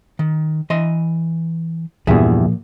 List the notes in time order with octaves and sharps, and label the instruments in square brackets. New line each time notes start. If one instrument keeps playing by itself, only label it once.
[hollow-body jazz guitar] D#3
E3 D#5 C6
[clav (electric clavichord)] E2 G2 [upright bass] A#2 F3 [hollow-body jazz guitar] G#4 E5